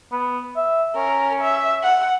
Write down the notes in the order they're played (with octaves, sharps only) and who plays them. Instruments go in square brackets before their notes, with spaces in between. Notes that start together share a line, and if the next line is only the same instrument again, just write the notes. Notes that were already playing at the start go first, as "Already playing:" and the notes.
[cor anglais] B3
E5
[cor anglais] C#4 [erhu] A#4
[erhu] E5
F#5